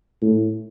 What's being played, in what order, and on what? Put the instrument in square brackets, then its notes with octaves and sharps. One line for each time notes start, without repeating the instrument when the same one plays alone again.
[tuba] A2